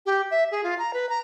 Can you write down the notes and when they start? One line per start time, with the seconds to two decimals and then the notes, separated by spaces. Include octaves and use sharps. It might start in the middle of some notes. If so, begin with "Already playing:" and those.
0.06 G4
0.31 E5
0.51 G#4
0.63 F4
0.79 A#5
0.94 B4
1.09 A#5